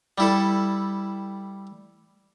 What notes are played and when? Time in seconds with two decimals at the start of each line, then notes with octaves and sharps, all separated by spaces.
0.18 G3 E4 A4